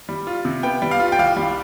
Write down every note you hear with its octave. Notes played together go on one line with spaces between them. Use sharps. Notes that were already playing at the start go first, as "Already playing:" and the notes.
G3
F4
C3
B3 G5
G3
F5
F4
G5
C2 F5
G3